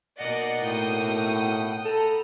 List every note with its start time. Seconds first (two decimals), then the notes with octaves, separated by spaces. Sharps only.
0.18 B2 A#3 D#4 D5 D#5 F#5
0.61 A2 F#5 G5 D#6
1.85 A4 A#5 B5